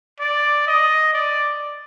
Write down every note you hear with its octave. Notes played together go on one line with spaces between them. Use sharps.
D5
D#5
D5